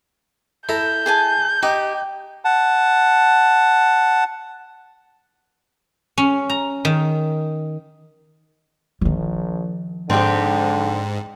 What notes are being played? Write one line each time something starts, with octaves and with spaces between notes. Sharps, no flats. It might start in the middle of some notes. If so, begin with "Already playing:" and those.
E4 A4 A#5 G6
G#4 G#5 A5
D#4 G4
F#5 A5
C#4
A#5
D#3
A#1 D#3 F3
G#2 D3 C4 G4